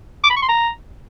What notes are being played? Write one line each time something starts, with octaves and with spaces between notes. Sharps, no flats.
D6
B5
C#6
C6
A#5